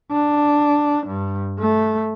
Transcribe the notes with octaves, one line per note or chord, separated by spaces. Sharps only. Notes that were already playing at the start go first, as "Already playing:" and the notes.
D4
G2
A3